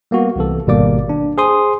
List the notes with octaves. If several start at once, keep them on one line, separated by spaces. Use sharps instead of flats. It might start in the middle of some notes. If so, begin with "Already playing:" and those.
G3 A#3 B3 F#4
C2 C3 E3 A4
G#1 B2 G3 A#3 D5 D6
D4
G#4 C5 C6 D#6